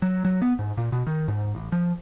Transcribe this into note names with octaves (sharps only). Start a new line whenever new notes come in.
F#3
F#3
B3
G#2
A#2
B2
D#3
G#2
A1
F3